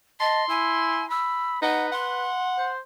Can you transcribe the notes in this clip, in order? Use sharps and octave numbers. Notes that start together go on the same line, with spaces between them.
D#5 A5 C6
E4 G#5
B5 E6
D#4 B4 F#5
F#5 C6
C5